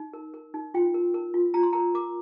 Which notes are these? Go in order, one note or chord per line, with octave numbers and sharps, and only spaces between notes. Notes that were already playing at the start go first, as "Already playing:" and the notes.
Already playing: D#4
A#4
A#4
D#4
F4 G5
A#4
A#4
F4
F4 A#5
C6
A#4 A#5
A#4 D6